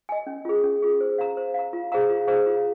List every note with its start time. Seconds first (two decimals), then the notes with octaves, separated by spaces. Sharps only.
0.09 D#5 G#5
0.27 C#4
0.45 F4 G#4
0.64 C#4
0.82 F4 G#4
1.01 C5
1.18 F5 A#5
1.37 C5
1.54 F5 A#5
1.73 F4
1.92 G#4 C5 F5 A#5
2.09 F4
2.28 G#4 C5 F5 A#5
2.46 F4